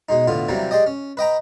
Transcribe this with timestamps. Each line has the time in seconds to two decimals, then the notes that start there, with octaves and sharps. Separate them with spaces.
0.09 B2 G#3 D#4
0.28 A2 D3 B3 F4
0.49 C3 E3 F#3 G3 A#3
0.71 G#3 G4 D5 D#5
0.86 C#4
1.17 B4 D#5 G5 A#5